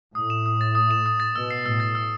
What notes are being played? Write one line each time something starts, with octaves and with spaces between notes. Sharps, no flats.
A2 D#6
E7
D#6
A6
D#6
E7
D#6
A6
B2 E6
C7
A2 E6
A6
E6